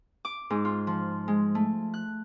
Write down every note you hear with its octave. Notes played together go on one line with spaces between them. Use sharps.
D6
G#2
F4
F3
G#3
A3
F#6